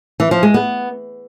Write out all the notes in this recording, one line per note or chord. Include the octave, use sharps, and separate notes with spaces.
E3
F3
G#3
B3